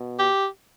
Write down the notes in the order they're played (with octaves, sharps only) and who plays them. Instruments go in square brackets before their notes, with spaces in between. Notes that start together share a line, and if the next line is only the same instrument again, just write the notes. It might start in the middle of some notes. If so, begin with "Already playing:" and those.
Already playing: [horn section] B2
G4